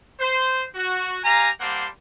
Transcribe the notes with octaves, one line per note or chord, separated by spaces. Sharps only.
C5
F#4
G4 F5 G#5 A#5
G3 A#3 C4 F#5 A5 C6